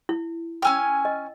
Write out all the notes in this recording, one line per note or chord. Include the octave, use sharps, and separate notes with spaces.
E4
C#4 G5 G#5 E6 F6
D#5